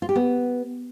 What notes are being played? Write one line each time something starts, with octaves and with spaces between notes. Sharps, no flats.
F4
G4
B3